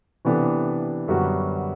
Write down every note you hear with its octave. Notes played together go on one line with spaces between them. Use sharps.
C3 E3 B3 D4 A4
F#2 D3 G3 B3 F#4